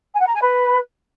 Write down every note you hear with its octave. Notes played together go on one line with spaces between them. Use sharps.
G#5
F#5
A#5
G#5
B4